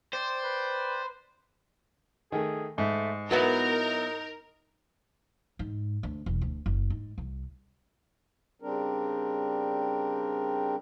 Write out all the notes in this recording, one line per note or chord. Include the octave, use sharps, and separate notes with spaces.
C5 D5 G5
B4
D#3 A3 G#4
G#2 A3
F#3 B3 D#4 E4 A#4
G#2
D2
E1
D2
F#1
G#2
C2
C#3 G3 C4 D4 A#4